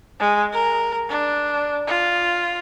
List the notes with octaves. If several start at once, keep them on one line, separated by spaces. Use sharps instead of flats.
G#3
A#4
D4
F4